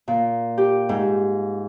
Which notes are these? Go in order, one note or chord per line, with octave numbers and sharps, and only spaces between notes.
A#2
G4
G#2